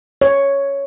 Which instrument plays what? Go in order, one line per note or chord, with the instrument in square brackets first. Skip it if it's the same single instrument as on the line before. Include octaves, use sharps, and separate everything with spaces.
[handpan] C#5